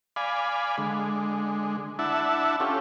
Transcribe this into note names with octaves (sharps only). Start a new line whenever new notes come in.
D5 F5 G#5 B5
D3 G#3
D4 E4 E5 F#5 A5
C#4 F4 G4 A4